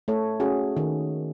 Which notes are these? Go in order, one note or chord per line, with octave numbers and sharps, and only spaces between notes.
A3 A4 C#5
C#4 F#4 G#4
D#3